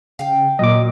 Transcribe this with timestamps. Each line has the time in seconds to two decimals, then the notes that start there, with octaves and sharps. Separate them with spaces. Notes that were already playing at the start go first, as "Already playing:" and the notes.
0.19 C#3 F5 G5
0.59 A#2 F#3 D#5 D6